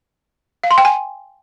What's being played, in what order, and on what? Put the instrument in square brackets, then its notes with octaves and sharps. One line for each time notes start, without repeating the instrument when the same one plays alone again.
[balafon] F5
C6
G5
G#5